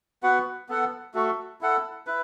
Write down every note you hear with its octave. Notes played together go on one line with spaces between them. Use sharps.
B3 F#4 B4 F#5
B3 A4 F#5
A3 F#4 A4
E4 A4 F#5
E4 B4